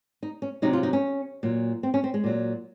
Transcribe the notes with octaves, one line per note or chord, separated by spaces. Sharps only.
D#4
C#4
C3 F#3 D#4
F4
D#4
C#4
A#2 F#3
C4
C#4
C4
G#3
A#2 F#3